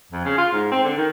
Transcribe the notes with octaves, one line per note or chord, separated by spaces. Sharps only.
F2
C#3
F4
G#2
C4
D3
D#3